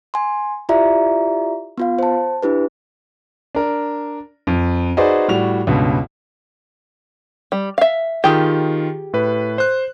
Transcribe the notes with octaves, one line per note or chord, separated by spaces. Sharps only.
G#5 C6
E4 F4 G4 D5 E5 A#5
B3 F4 F5
C5 A5
D4 E4 G4 B4
D4 A#4
F2
D#4 F#4 G#4 B4 C5 D5
A2 G3 F#4 F7
C#2 G2 B2
G3
E5 F5
D#3 F4 G4 G#4
A2 B4
C5 F#6